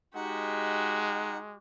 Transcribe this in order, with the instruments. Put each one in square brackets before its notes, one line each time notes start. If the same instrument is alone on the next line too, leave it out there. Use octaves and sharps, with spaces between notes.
[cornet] G#3 [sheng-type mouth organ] D#4 F#5 [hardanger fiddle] F#4 G4